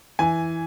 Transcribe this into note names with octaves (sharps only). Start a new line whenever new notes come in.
E3 G#5